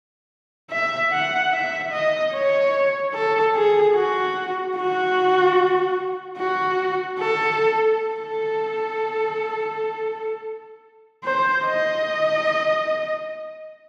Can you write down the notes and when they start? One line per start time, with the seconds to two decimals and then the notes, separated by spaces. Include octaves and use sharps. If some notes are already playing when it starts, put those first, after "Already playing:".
0.70 E5
1.12 F#5
1.53 E5
1.92 D#5
2.33 C#5
3.13 A4
3.54 G#4
3.95 F#4
4.77 F#4
6.37 F#4
7.19 A4
8.00 A4
11.24 C5
11.65 D#5